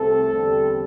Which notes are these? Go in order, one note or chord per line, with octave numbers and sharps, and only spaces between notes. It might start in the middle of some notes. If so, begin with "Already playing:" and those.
Already playing: C2 C3 A3 C4 A4
E2 D3 G3 C4